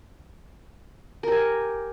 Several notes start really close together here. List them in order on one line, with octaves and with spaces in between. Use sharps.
A#4 G4 G#5